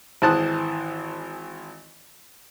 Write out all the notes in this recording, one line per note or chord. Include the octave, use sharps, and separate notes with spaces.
G#1 E3 C5 A5 D#6 F#6